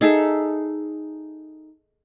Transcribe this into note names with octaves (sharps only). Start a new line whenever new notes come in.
D#4 G#4 A4 E5